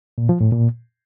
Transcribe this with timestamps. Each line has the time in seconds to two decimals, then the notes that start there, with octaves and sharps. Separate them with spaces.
0.18 A#2
0.29 F3
0.41 A2
0.52 A#2